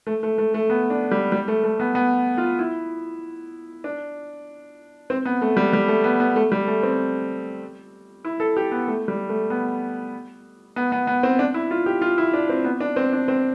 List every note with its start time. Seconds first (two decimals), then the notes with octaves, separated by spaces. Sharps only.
0.07 A3
0.23 A3
0.38 A3
0.54 A3
0.70 B3
0.90 D4
1.11 G3
1.32 G3
1.48 A3
1.64 A3
1.80 B3
1.95 B3
2.38 F4
2.59 E4
3.84 D4
5.10 C4
5.26 B3
5.41 A3
5.57 G3
5.73 G3
5.88 A3
6.04 B3
6.20 B3
6.36 A3
6.52 G3
6.67 A3
6.83 C4
8.25 E4
8.40 A4
8.57 G4
8.72 B3
8.88 A3
9.08 G3
9.29 A3
9.50 B3
10.76 B3
10.92 B3
11.07 B3
11.23 C4
11.39 D4
11.54 E4
11.71 F4
11.86 G4
12.01 F4
12.18 E4
12.34 D4
12.49 C4
12.64 B3
12.80 D4
12.96 C4
13.13 D4
13.28 C4